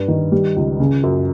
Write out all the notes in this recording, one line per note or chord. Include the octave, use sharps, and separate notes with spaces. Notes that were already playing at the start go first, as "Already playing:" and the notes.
Already playing: G2
D#3
G3
C#2
C#3
F#2